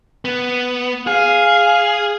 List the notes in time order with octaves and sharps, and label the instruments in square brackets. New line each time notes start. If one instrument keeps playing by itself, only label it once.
[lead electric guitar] B3
[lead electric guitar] G#4 [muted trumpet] F5